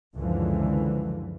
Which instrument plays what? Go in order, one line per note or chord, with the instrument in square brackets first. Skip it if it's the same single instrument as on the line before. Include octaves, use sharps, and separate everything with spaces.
[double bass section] C#2 F#2 D3 E3 F3